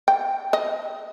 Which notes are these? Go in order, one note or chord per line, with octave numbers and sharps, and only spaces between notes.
G5
D#5